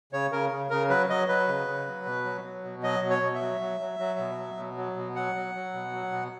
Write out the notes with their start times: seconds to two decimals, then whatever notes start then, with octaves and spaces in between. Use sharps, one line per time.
0.12 C#3 C#5
0.31 C#3 A#4
0.52 C#3
0.70 C#3 A#4
0.89 F#3 B4
1.09 F#3 D#5
1.28 F#3 B4
1.48 C#3
1.67 C#3
1.86 F#3
2.06 B2
2.25 F#3
2.44 F#3
2.64 B2
2.83 F#3 D#5
3.02 B2
3.10 C#5
3.23 B2
3.35 E5
3.41 F#3
3.60 F#3
3.80 F#3
3.99 F#3
4.19 B2
4.38 F#3
4.57 B2
4.77 F#3
4.97 B2
5.15 F#3 F#5
5.35 F#3
5.55 F#3
5.73 B2
5.93 F#3
6.12 B2